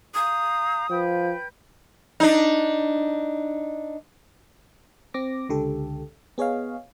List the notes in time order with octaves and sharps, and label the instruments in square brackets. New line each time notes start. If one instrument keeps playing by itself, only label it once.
[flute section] F5 A#5 G6 [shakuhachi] D#6
[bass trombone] F3 [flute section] B4 G5 G6
[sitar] D4 D#4
[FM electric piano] C4 D6 A#6
C#2 D3 G4 A4
B3 G#4 C#5 D#5 F5